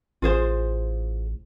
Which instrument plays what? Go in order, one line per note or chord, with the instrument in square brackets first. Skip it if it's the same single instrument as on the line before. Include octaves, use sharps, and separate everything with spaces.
[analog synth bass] A1 [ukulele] F4 G#4 C5